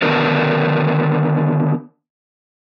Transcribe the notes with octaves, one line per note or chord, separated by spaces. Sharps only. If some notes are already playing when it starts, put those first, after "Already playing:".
D3 D#3 B3 D4 A#4 B4